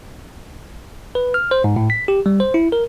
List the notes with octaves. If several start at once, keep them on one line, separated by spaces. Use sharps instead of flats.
B4
F6
C5
G#2
A2
B6
G4
G3
C5
E4
A#4